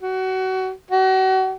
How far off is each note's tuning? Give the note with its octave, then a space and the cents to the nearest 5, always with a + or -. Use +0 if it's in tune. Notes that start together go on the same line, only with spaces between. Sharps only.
F#4 +25
F#4 +35